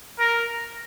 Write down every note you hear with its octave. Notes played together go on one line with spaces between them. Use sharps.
A#4